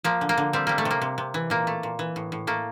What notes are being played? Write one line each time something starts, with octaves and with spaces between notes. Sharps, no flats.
F3 A#3
D3
A#3
D3
G3 C4
G3 A#3
A3
C3
A#3
C3
C3
E3
A#2 A#3
A3
A#2
E3
A2
A2
A3 A#3